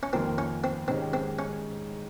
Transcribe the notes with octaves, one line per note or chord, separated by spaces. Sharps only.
C#4
F2 D#3 A#3 C4 F4 A#4
C#4
C4
G#2 D#3 G#3 C4 C#4 G4
C4
C#4